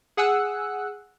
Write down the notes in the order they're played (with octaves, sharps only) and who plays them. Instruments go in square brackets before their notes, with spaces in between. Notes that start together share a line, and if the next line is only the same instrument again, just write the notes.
[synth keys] G#4 F#5 G#5 E6 F#6